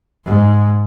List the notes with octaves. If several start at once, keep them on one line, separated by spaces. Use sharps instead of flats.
G#2